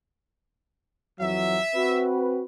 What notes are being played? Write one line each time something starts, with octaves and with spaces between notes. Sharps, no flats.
F2 E3 F#3 E5
C4 F#4 B4